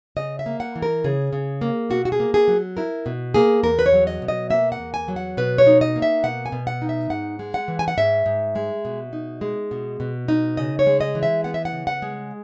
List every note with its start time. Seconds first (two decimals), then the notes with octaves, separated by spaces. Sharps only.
0.17 C#3 D#5
0.39 E5
0.46 A#3
0.60 F#5
0.76 E3
0.82 A#4
1.04 C#3 G#4
1.33 C#3
1.61 A#3
1.90 B2 F#4
2.05 F#4
2.12 G#4
2.20 A#3
2.34 G#4
2.48 F#3
2.77 E4 A#4
3.06 B2
3.34 A#3 G#4
3.63 E2 A#4
3.79 B4
3.86 C#5
3.93 F#3
4.07 D#5
4.22 B2
4.28 D#5
4.50 A#3 E5
4.72 F#5
4.79 E2
4.94 G#5
5.08 F#3
5.16 F#5
5.37 B2 B4
5.58 C#5
5.67 D#4
5.81 D#5
5.96 A#3
6.02 E5
6.23 B2 F#5
6.46 G#5
6.52 B2
6.67 F#5
6.82 D#4
6.89 E5
7.10 G#2 F#5
7.39 G#3
7.54 F#5
7.68 E3
7.79 G#5
7.88 F#5
7.97 G#2 E5
8.26 G#2
8.55 G#3
8.85 B2
9.13 D#4
9.41 G#3
9.71 B2
10.00 B2
10.28 D#4
10.57 C#3 D#5
10.79 C#5
10.87 G#3
11.01 D#5
11.15 E3
11.23 E5
11.44 B3 F#5
11.54 E5
11.65 F#5
11.73 C#3
11.87 F#5
12.02 G#3